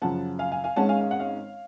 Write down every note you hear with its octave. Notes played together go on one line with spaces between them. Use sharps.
F#2 C#3 F3 F#5 A5
F5 G#5
F5 G#5
F5 G#5
G#1 G#2 G#3 C#4 F#5 A5
F5 G#5
F5
F#5
C#5 F5